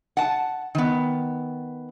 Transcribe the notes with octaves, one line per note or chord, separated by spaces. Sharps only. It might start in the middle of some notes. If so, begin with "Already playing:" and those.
F#5 A5
D#3 B3